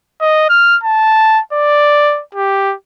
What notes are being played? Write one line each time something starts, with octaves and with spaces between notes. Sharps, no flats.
D#5
F6
A5
D5
G4